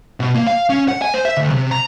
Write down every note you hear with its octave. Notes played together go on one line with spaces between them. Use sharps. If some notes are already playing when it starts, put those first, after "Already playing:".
B2
A#3
F5
C#4
F#5
G#5
C5
E5
D2
C3
A#5